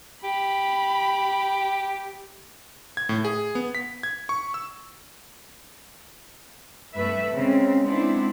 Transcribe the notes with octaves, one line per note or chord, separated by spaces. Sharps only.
G4 B5
G#6
A2
G#4
B3
B6
G#6
C#6
E6
G2 A3 B4 E5
C#3 G#3 C4
G#3 B3 C4 D4 E4